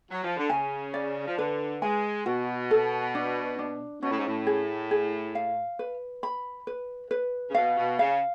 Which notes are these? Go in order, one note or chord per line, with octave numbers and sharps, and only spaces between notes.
F#3
F3
D3
C#3 G#5
D5
F3
D3 B4
G#3 G#5
B2 F#4
A4
D4
D4
B2 C#4
A2
G#2
A2
G#4
G#4
F5
B4
B5
B4
B4
C#3
B2 F5
B2
C#3 F5